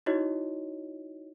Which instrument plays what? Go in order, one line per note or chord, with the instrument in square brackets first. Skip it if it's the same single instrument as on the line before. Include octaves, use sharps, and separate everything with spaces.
[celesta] D#4 E4 F#4 C#5 D#5